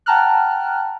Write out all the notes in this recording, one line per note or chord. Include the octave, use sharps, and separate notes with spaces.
F#5 G5 A5 A#5 F6 F#6